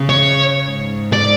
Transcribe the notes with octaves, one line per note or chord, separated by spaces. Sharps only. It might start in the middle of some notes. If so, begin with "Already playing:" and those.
Already playing: C#3
C#5
G#2
D5